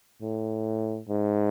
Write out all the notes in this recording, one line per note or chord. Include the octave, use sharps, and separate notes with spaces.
A2
G#2